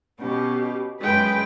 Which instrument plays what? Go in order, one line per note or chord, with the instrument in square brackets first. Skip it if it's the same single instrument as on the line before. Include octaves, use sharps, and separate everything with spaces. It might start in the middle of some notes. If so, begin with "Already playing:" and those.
[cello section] B2 [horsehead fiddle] C#4 G4
[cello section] F#2 B4 [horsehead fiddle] G#3 G5